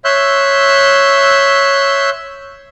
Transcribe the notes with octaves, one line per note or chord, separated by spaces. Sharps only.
C#5 E5 C6 E6 F#6 G6